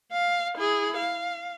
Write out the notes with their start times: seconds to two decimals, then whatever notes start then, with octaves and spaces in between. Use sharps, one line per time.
0.13 F5
0.57 E4 G#4
0.97 F5